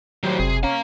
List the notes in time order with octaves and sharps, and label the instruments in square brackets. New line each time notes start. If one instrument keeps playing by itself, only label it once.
[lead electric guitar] A2 D#3 [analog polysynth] F#3 G3 C5
[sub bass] F#1 [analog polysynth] C3 [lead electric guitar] G#4
[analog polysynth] C#4 [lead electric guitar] F5 A#5